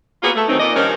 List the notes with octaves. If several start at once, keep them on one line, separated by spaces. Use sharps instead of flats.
A#3 B3 C#4 F4 F#4 G#4
A3
D#3 E3 F#3 A3 C4 D#4
A#2 D5 D#5
G2 D#3 F3 A#3 C#4